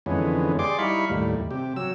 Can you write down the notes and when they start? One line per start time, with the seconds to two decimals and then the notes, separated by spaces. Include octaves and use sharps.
0.06 F2 D3 E3 G#3 B3 C#4
0.59 G4 G#4 D5 C6 D6
0.79 G3 D#4 E4 F5 B5 C#6
1.10 D#2 A2 G3
1.51 C3 G4
1.76 F#3 E6